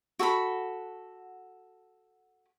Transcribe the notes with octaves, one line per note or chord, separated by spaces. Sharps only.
F#4 A4 F#5 B5